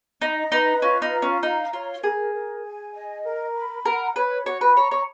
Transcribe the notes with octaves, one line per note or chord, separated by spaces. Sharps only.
D#4 D#5
D#4 B4
C#4 F4
D#4
A#5
C#4
D#4 F5
F4 C#5
G#4 A#4
A#4
G#5
D#5
A#4
B5
A#4 F#5
B4 C#5
F#4 C#5
B4
C#5 A#5
C#5